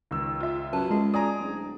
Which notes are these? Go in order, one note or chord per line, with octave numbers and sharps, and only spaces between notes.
C#2 D#3 E6
F4 E5
F#2 B4 A5
C#2 G#3 G#4
D5 G#5 A#5 D#6
D1